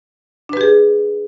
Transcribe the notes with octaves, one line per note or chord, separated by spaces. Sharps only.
D4 G4 G#4 B4